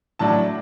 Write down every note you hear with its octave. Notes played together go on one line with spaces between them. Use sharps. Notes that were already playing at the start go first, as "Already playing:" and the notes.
A2 F#3 D4 A5